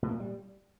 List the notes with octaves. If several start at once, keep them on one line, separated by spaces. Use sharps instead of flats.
A2
A#3
A#2
G3